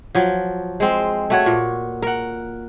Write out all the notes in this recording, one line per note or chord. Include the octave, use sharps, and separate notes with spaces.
F3 F#3
G#3 C4
A3 F#4 C#5
A#2
A#4 F#5